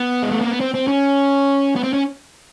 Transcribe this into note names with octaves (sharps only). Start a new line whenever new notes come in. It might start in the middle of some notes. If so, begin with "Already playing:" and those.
Already playing: B3
G#3
A3
A#3
B3
C4
C4
C#4
B3
C4
C#4